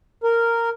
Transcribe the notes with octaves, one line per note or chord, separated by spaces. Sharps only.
A#4